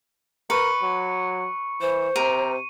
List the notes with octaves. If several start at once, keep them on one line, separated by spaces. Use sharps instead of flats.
A#4 B4 C#6 C#7
F#3
E3 C5
C3 A#4 D#7